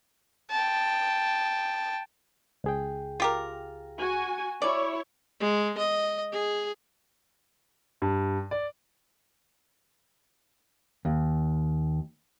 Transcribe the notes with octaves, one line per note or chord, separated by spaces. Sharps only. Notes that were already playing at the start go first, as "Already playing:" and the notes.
G5 A5
C#2 G#4 G5
F4 G4 A#4
F#4 G#5
E4 C#5 D5
G#3
D#5
G#4
G2
D5
D#2